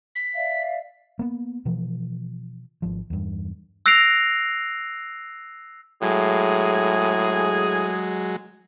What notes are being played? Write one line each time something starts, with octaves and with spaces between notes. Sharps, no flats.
B6
D5 E5 F5
A#3 B3
B2 E3 F3
G#1 F3
E2 G2
E6 F#6 A#6 C7 D7 F7
A2 F#3 G#3 G#4